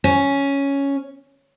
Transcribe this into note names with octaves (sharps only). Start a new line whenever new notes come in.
C#4